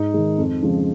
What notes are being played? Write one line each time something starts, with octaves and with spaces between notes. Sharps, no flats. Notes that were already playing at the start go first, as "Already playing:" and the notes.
Already playing: G#2 D#4
D#3 G#3
F2
C#3 F3 G#3